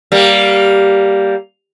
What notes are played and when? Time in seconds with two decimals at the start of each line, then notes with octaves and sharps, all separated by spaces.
0.12 G3 A#3